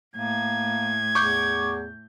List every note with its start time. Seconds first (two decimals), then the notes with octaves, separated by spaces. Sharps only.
0.16 A2 A#3 G#6
1.15 E2 C#6 D6 G6